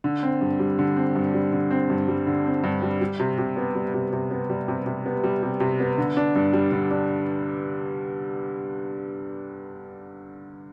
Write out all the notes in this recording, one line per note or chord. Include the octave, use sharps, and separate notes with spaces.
D3
C4
G2
G3
D3
C4
G2
G3
D3
C4
G2
G3
D3
C4
G2
G3
G3
C3
C3
B3
G3
C3
C3
B3
G3
C3
C3
B3
G3
C3
C3
B3
D3
D4
G2
G3
D3
D4